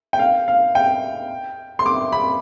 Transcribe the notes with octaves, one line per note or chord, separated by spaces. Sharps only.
G5
F5
F5
G5
C6
D6
B5